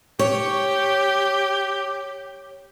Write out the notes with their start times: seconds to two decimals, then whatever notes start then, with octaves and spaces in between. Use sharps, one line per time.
0.19 G4 C#5